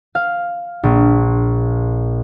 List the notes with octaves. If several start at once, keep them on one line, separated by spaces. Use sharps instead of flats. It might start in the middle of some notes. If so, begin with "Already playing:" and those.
F5
A#1